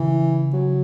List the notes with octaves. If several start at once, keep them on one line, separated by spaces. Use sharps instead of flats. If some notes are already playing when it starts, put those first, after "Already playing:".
Already playing: C#3 E3
F#3